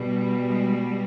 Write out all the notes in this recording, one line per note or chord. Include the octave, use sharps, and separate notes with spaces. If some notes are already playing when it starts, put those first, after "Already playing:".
Already playing: B2 G3
G#3